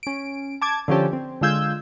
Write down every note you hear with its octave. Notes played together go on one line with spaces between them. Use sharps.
C#4 D7
A5 D6 G#6
D3 F3 C#4 G4 A4
C4
D3 G#3 F4 E6 G6 G#6